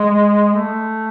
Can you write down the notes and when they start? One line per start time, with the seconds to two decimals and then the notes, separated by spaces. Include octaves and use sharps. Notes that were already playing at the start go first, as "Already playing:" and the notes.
Already playing: G#3
0.55 A3